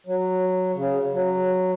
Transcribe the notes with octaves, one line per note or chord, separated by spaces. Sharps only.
F#3
C#3
F#3